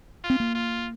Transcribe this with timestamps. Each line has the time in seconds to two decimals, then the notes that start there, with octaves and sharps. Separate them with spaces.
0.24 F4
0.30 C4
0.40 A#3
0.55 F4